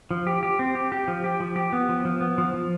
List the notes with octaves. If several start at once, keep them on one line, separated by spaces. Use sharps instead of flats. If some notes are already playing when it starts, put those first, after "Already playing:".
F3
G4
G4
C4
G4
G4
F3
G4
F3
G4
B3
F3
F3
B3
F3
F3